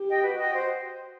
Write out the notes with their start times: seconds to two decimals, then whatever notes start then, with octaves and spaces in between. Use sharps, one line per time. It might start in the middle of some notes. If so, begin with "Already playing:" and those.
Already playing: G4
0.09 D#5 G5
0.24 F#4 B4
0.38 D#5 G5
0.53 C5